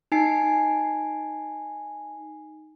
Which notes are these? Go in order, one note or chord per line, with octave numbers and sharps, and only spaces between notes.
D#4 G#5 C7